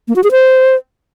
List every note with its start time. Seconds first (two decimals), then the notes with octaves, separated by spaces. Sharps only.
0.08 A#3
0.16 F#4
0.24 G#4
0.31 C5